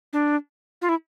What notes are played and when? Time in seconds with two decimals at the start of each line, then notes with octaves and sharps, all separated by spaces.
0.13 D4
0.82 F4
0.89 E4